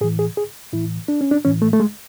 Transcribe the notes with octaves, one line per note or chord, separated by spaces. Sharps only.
A2 E3 G#4
G#4
G#4
A2 E3 E4
D4
C#4
D4
A2 E3 C#4
A3
A3
G#3